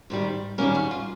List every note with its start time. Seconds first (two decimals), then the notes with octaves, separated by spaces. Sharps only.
0.10 G#2 D#3 G3
0.58 D#3 G3 A#3 C#4 A#4
0.75 F#4
0.91 F4